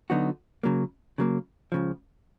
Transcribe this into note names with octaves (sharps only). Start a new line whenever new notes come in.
D3 F#3 B3 D#4 F#4
C#3 F#3 A#3
C#3 F#3 A#3
C#2 C#3 F3